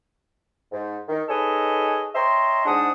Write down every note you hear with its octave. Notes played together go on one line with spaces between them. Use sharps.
G#2
D#3
D#4 G#4 A4 B4 C#5 D#5
C#5 D#5 E5 G5 A#5 C6
G#2 G#3 D4 C5 F#5 D#6